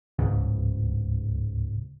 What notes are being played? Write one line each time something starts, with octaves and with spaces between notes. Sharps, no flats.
D1 C#2 G#2 C#3